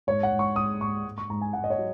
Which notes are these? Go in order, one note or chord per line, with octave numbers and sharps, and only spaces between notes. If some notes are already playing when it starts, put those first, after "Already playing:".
G#2 C#5
F#5
G#2
C#6
G#2 D#6
G#2 C#6
G#2
C#6
G#2 A#5
G#5
G#2 F#5
D#5
C#5
F#3